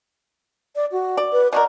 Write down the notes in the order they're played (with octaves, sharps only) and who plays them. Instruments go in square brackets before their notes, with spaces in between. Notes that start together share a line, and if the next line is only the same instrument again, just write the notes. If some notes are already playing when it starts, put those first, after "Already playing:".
[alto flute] D5
F#4
[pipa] D5
[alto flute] B4
[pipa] B2 F#4 A#4 [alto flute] D5